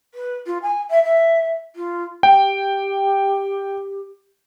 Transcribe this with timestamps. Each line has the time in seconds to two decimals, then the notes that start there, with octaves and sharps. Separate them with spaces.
0.14 B4
0.46 F4
0.62 G#5
0.90 E5
1.04 E5
1.76 F4
2.23 G4 G5